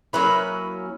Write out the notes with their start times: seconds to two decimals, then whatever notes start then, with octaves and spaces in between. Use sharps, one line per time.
0.13 F#3 A#3 C#4 E4 B4